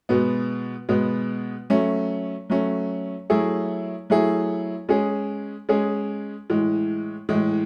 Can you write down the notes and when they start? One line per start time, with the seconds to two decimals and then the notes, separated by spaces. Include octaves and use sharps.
0.09 B2 G#3 B3
0.89 B2 G#3 B3
1.70 F#3 A3 C#4
2.50 F#3 A3 C#4
3.30 F#3 A3 E4 G#4
4.10 F#3 A3 E4 G#4
4.89 G#3 C#4 G#4
5.69 G#3 C#4 G#4
6.50 A2 E3 G#3
7.29 A2 E3 G#3